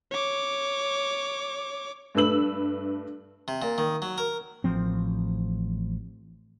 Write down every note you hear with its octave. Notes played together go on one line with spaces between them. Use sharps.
C#5 D6
G2 A3 B4 E6 F#7
C3
A#2
D#3
F#3
A#4
A1 F3 C4